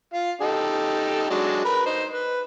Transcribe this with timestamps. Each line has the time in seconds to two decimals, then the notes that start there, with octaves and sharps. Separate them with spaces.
0.14 F4 F5
0.41 D#4 G4 A4
1.30 F#3 G#3 D4
1.65 A#4 B4 B5
1.86 D#4 C5
2.13 B4